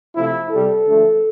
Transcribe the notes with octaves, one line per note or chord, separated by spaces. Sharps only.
C3 F3 A3 E4
C3 G3 A4
D3 F3 A3